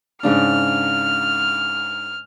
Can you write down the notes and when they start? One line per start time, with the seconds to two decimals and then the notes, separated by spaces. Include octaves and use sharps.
0.23 G#2 C#3 D4 F6